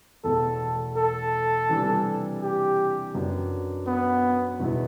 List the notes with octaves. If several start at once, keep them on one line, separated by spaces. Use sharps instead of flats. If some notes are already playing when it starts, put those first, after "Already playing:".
E2 B2 A3 A4
A4
C3 E3 G3 D4
G4
F#2 F#3 B3 D4
B3
E2 B2 F#3 B3 E4